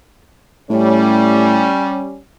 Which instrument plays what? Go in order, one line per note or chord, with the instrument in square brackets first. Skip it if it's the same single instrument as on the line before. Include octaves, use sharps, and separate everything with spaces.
[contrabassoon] A2 [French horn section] G3 C#4